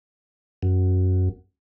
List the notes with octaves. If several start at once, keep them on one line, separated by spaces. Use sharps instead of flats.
F#2